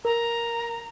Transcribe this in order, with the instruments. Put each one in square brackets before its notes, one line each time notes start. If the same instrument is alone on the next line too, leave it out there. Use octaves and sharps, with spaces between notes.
[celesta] A#4 [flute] A#5